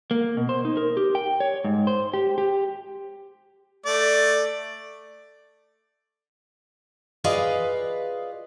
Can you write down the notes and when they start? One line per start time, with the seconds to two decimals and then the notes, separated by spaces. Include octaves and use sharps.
0.11 A#3
0.37 B2
0.49 C5
0.65 D#4
0.77 A#4
0.97 G4
1.15 G5
1.40 C#5
1.64 G#2
1.87 C5
2.14 G4
2.38 G4
3.86 A3 D5
7.24 F4 G#4 B4 D5 D#5 F5